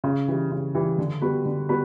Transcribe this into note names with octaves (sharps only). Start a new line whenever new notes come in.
C#3
E3 G3
C#3
E3 G3
D3
G3 B3 F#4 B4
D3
G3 B3 F#4 B4